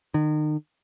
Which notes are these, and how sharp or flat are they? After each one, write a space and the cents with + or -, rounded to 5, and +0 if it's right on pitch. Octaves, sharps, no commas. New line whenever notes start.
D#3 -35